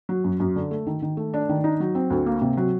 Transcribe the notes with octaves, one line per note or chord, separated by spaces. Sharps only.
F#3
F#2
F#2
D3
A3
D#3
D#3
A3
D4
D#3
D#4
F#3
C4
D2
A#3
C3
F#3